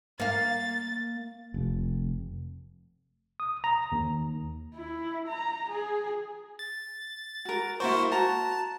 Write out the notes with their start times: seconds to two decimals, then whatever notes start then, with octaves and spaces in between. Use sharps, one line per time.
0.20 A#3 F5 A6
1.54 F1
3.40 D#6
3.64 A#5
3.92 D#2
4.76 E4
5.28 A#5
5.70 G#4
6.59 A6
7.45 F#4 A#4
7.80 A#3 E4 F#4 C5 C#6
8.12 F#4 A5 A#5